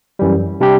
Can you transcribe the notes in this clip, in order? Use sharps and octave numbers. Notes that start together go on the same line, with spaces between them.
F#2 E3 G3
C3 G3 D4 G4